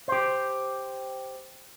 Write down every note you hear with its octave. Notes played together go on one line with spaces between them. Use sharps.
G4 C5